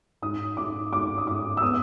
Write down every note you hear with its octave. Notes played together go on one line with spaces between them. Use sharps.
G#2 D#6
G#2 D6
G#2 D6
D#6
G#2 D6
E6
B3 D#6